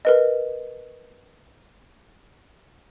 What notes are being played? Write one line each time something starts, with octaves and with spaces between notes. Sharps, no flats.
A#4 B4 D#5